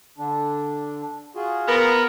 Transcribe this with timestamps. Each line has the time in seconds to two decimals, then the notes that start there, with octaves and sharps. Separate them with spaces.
0.18 D3 D4
1.35 F4 F#4 G#4
1.67 B3 A#4